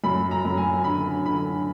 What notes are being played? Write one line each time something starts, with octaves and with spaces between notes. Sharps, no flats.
F#2 B5
A#5
F#2
G#5
D3 B5
D3 B5